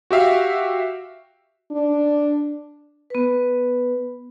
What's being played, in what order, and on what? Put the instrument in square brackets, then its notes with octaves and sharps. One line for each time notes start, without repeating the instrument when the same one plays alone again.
[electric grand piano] F#4 G4 E5 F5
[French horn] D4
[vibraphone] B3 B4